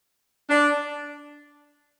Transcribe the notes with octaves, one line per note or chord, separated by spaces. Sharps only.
D4